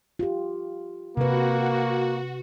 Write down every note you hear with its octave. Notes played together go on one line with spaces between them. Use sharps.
F4 G4
C3 A#3 F#4 B4